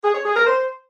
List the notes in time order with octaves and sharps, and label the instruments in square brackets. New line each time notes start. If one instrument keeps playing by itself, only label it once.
[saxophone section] G#4
C#5
G#4
A#4
C5